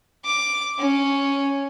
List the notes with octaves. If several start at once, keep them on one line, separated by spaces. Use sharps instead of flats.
D6
C#4